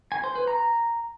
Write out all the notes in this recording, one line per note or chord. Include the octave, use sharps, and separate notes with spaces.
G#5
C5
B4
A#5